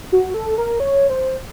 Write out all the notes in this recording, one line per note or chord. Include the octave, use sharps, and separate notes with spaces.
F#4
A4
A#4
C#5
C5